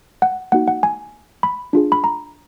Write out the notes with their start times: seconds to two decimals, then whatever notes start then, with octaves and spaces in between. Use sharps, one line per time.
0.22 F#5
0.52 A#3 D#4 F#4 F#5
0.68 F#5
0.83 G#5
1.43 B5
1.73 D4 F4 G#4
1.92 B5
2.04 A#5